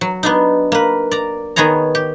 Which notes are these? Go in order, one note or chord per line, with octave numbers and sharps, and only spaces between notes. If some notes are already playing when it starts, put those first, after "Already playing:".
F#3
B3 D4 D#4
A#3 B4
D5 A#5
D#3 B3 G#4 C#5 A#5
G4